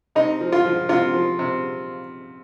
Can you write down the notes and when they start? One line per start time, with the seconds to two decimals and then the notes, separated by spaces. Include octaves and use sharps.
0.15 C3 D#4
0.41 F3
0.52 F4
0.65 F3
0.89 C3 F4
1.14 F3
1.39 C3